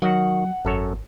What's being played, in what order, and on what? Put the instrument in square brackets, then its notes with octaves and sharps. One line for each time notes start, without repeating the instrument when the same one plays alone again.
[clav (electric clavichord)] D#3 F#4 [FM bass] F#3 [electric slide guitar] F#5
[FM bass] G#1 [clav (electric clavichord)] F#2 A4 C#5